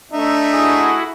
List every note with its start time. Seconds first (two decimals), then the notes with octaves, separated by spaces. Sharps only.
0.12 A3 D4 D#4 E5
0.53 E4 F#4 G#4